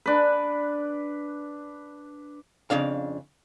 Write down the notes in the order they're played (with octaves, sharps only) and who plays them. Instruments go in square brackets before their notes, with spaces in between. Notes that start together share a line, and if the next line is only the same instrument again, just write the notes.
[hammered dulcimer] D4 B4
[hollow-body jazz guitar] F2 C#3 D4 F5